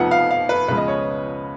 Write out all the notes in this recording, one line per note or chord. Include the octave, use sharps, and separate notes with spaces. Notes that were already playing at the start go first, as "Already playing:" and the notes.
Already playing: F1 F2 F3 B3 D#4 F#5
F5
F5
B4
C#2 C#3 F3 G#3 B3 B4
D#5
C#5